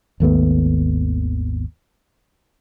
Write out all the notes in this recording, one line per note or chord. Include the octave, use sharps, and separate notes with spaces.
G#1 D#2 A3 B3